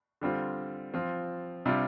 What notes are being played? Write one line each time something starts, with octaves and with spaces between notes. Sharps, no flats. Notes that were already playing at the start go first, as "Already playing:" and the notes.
D3 G3 C4 F4
F3 C4 F4
C3 G3 D4 F4